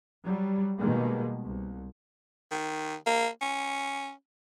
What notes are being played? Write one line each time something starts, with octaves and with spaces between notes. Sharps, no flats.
F#3 G3
B2 D#3 G3 G#3 A#3
C2
D#3
A#3
C#4